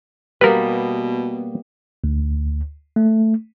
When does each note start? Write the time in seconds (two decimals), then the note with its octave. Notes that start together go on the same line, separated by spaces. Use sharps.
0.41 B2 G3 A#3 B3 A#4 B4
2.04 D2
2.96 A3